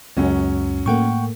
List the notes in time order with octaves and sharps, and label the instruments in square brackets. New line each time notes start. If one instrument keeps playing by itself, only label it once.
[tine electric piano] C#2 F#2 [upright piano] F#3 C#4
[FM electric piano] A2 A3 A#3 [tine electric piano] F#5 G5 C#6